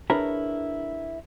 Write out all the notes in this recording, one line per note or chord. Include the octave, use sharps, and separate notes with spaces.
D4 E4 G#4 A#4 B4 C#5